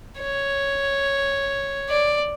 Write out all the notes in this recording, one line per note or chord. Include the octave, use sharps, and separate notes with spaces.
C#5
D5